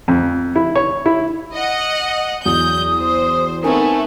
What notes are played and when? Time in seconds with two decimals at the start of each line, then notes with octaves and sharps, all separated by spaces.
0.08 F2
0.56 E4
0.75 C#5
1.06 E4
1.54 D#5 F#5
2.46 E2 F#3 D#6 G6
3.01 C5
3.64 A3 B3 C4 D#4 A#4 G#5